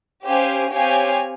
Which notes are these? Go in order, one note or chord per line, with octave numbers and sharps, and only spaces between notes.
C#4 G4 C5 F5 G#5
C4 G4 C#5 F5 G#5